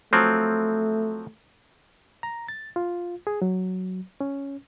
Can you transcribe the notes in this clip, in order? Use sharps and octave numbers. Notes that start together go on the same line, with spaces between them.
F3 F#3 A3 C4
A#5
A6
F4
G#4
F#3
C#4